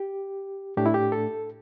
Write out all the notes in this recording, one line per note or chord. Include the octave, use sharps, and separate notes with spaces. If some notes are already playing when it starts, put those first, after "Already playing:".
Already playing: G4
A2 A3 D4 G4
E4
G4
A4